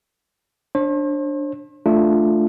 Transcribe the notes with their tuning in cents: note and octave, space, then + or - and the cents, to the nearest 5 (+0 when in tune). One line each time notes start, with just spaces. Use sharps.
D4 +0 C5 +45
A3 +0 D4 +0 F4 +0